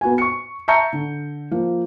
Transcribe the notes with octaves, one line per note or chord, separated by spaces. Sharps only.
B3 F#4 G#5
C#6 C#7
E5 A5 A#5 C#6 G6 C#7
D3
F3 A#3